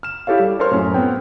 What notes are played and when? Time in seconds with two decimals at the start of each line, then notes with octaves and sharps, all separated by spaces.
0.03 F6 E7
0.27 E4 G4 A4 C#5 F5
0.40 G3
0.60 A4 A#4 C5 C#5 C6 F6
0.71 F#2 A2 C#4
0.94 B3 C4 G5